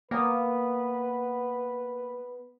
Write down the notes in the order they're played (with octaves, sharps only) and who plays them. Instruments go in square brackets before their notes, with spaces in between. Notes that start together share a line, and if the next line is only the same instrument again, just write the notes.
[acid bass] A#3 [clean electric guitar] B3 [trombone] B4